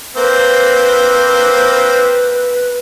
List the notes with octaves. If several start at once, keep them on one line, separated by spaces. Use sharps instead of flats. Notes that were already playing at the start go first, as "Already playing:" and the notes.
A#3 C4 B4 C5